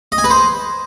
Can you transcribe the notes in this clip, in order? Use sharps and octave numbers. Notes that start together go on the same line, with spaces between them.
D#5
G#5
B4
C5